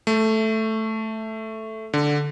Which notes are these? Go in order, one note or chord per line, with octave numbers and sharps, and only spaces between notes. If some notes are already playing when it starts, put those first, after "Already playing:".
A3
D3